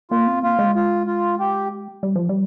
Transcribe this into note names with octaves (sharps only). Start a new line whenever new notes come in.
A#3 F4
C4
A#3 F4
G#3
F4
F4
G4
G3
F3
G3